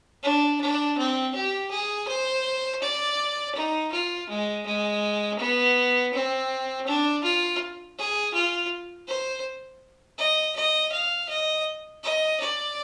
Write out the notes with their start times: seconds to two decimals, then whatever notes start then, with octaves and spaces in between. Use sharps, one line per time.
0.23 D4
0.61 D4
0.97 C4
1.35 G4
1.71 G#4
2.08 C5
2.82 D5
3.55 D#4
3.92 F4
4.29 G#3
4.66 G#3
5.39 B3
6.13 C4
6.87 D4
7.24 F4
7.98 G#4
8.34 F4
9.08 C5
10.18 D#5
10.56 D#5
10.92 F5
11.29 D#5
12.03 D#5
12.40 D5